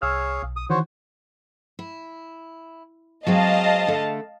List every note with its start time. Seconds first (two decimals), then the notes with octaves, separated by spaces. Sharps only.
0.02 C2 G#4 C#5 F5 E6 F6
0.43 B1
0.56 D#6
0.70 D#3 E3 F#4 C5 C#5
1.79 E4
3.27 F#3 G#3 C4 D#5 F5 A5
3.87 D3 A3